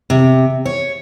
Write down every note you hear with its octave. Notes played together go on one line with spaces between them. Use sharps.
C3
C#5